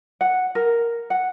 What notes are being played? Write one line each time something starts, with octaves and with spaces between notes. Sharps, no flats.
F#5
A#4
F#5